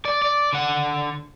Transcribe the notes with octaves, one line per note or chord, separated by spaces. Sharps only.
D5
D5
D3 F#5